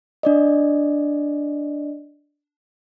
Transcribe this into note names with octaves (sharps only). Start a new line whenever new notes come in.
D4 D5 D#5